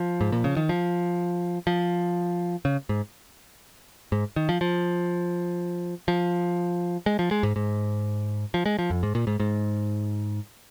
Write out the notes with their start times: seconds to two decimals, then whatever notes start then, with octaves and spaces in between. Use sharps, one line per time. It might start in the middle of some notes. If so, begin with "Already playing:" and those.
Already playing: F3
0.21 G#2
0.32 A#2
0.44 C#3
0.57 D#3
0.69 F3
1.67 F3
2.65 C#3
2.89 G#2
4.12 G#2
4.36 D#3
4.49 F3
4.61 F3
6.08 F3
7.06 G#3
7.19 F3
7.31 G#3
7.43 G#2
7.56 G#2
8.54 F3
8.66 G#3
8.79 F3
8.90 F2
9.03 G#2
9.15 A#2
9.27 G#2
9.40 G#2